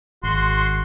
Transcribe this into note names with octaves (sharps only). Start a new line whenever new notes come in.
G#1 F#4 C6